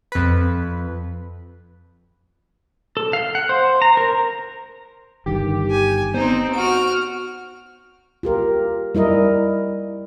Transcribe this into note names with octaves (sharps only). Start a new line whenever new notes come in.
F2 B4
A4
F5
F#5
C5
A#5
A#4
G1 G2 D#3 G4
G#5
B3 C4 D#4 C5
F#4 F6 D7
F4 G4 A#4
G3 E4 A#4 D#5